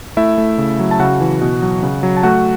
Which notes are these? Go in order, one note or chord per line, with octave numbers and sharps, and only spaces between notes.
A3 E4 E5
A3
C#3
F#3
A5
C#3 F#4 F#5
E3
B2
F#3
C#3
F#3
A5
A3 F#4 F#5